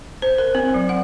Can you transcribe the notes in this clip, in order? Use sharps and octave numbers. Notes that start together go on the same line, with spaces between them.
C5
A#4
C4
F#3
F#5